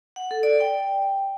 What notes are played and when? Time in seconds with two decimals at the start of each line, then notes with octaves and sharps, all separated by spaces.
0.16 F#5
0.31 A4
0.43 D5
0.60 G5